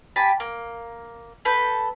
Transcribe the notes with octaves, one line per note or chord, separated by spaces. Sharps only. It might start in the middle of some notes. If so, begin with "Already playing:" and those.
G4 G#5 A5 B5
A#3
A4 B4 G6